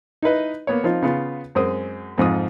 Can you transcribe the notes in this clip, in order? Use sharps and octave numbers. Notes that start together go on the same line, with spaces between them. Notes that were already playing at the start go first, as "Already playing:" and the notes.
D#4 E4 B4 D#5
A#3 B3 C#5
F3 C4 D#4 F4
C#3 B3 F4
F#2 G#3 C4 D#6
F2 G#2 F3 D#6